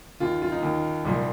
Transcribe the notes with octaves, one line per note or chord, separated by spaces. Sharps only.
D#2 D#3 F4
F4
D#4
D#2 D#3
C2 A#2 F3